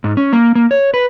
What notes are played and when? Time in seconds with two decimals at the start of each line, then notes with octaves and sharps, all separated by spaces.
0.04 G#2
0.17 C#4
0.33 A#3
0.55 A#3
0.71 C#5
0.94 B4